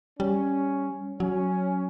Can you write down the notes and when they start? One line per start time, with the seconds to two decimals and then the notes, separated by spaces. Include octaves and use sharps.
0.19 G3 C#4
1.20 F#3 C#4